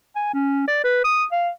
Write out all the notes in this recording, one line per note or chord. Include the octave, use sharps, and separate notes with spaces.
G#5
C#4
D5
B4
D#6
F5